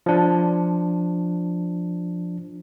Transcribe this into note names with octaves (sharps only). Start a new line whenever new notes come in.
F3 D4